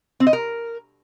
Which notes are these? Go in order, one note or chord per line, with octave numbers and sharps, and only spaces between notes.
C4
D#5
A#4